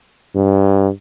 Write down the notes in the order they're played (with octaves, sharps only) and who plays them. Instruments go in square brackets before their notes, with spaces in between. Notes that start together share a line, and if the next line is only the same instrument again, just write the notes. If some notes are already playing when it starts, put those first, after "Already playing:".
[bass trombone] G2